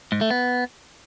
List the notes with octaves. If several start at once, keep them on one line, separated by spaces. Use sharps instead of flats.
G#2
A3
B3